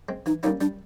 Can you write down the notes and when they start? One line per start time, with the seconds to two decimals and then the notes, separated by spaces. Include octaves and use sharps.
0.09 G#3 C4
0.26 E3 D#4
0.43 G3 A#3 C#4 D#4 E4
0.61 G3 D4